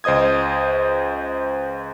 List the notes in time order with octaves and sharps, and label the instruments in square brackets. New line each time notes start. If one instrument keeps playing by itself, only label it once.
[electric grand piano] C#2 C5 D#5 D#6 G#6